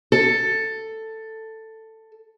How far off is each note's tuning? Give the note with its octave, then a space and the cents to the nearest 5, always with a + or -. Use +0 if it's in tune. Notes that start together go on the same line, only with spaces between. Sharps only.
A4 +10